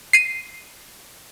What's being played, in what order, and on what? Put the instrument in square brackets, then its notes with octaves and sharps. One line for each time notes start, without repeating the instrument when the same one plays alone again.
[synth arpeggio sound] C7 D#7